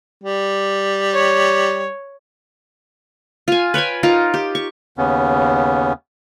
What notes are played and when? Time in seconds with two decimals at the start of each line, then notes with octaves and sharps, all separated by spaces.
0.24 G3
1.13 C#5
3.48 F4 G#5
3.74 B4 C#5 G5 G#5
4.03 D#4 F4 A#4
4.34 G4
4.55 C#6
4.98 D#2 C#3 B3 C#4